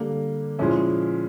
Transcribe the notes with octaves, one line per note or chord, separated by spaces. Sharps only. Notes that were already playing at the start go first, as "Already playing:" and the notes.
Already playing: D3 G3 A#3
A#2 F3 G#3 C#4 E4